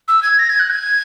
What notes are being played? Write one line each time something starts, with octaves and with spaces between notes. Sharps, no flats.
E6
G#6
A#6
G#6
F#6
G#6